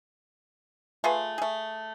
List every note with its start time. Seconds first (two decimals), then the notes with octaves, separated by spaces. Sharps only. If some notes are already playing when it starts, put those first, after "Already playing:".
1.04 A3 F4 G#4 B4
1.38 A3 G#4